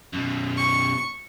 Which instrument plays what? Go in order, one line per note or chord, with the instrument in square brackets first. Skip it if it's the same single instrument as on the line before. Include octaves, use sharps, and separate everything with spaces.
[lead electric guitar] F#2 B2
[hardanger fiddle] C#6